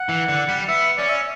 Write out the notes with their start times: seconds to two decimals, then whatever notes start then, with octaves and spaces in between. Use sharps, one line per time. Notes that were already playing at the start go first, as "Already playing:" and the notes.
Already playing: F#5
0.09 E3
0.28 D3
0.48 G3
0.69 B3 E5
0.97 C#4 D5
1.09 E5